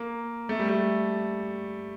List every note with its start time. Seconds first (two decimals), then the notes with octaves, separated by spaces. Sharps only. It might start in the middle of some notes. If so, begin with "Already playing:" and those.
Already playing: A#3
0.49 A3
0.59 G3
0.69 A3